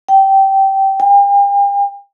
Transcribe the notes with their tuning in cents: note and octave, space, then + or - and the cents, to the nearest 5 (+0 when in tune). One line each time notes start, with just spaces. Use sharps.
G5 -15
G5 +40